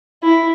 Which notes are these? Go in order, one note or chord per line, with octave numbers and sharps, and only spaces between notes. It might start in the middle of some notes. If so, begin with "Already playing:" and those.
E4